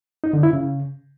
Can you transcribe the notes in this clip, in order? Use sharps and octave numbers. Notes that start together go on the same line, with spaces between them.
D#4
D3
E4
C#3